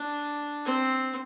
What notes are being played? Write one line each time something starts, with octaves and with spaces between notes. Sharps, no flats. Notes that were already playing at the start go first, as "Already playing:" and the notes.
Already playing: D4
C4